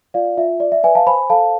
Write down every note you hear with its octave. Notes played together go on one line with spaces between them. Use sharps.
F4 D5 F5
F4 E5
D5
E5
B4 E5 G#5
F5 A5
C5 G#5 B5
A4 F5 A5